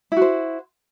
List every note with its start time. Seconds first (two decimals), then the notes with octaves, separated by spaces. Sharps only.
0.12 E4
0.17 F#4
0.22 C5